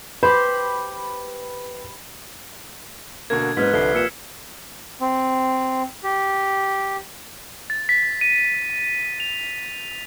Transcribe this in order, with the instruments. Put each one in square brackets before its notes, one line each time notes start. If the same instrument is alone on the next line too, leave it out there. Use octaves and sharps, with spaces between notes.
[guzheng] G4 C5 [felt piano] B4 [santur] B5
[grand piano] B2 D3 A#3 [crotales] G#6
[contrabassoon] F#1 [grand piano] G#2 [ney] B4 [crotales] F6 G#6 B6
[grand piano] C2 F3 [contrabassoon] D3 [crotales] C7 G7
[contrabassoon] A#2 [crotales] E6 C#7 E7
[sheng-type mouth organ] C4
G4
[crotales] A6
B6
D#7
F7